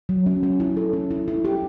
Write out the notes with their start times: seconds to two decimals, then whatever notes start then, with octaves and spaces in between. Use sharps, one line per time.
0.09 F#3
0.26 C#4
0.43 C#4
0.60 E4
0.77 A4
0.93 C#4
1.11 E4
1.28 E4
1.45 G4